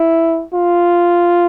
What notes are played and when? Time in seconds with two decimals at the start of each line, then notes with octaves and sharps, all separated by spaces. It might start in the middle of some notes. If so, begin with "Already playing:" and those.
Already playing: E4
0.53 F4